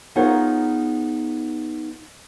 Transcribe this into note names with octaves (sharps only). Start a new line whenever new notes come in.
B3 D#4 F4 G#4 A#4 C#5